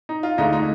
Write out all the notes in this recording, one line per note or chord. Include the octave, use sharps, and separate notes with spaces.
D#4
F4
D2 D3 G#3 D#4
D#4